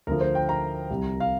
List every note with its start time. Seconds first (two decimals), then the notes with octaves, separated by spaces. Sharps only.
0.07 D2 D3 F3 A#4
0.21 C5
0.35 G5
0.49 A#5
0.90 C2 C3 G3
1.20 F5